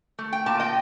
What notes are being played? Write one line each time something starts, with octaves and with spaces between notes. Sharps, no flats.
A3
G5
A#2 A5
D#5 G5